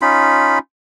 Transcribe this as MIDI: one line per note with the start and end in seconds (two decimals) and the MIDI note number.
0.02 0.59 61
0.02 0.59 63
0.02 0.59 65
0.02 0.59 83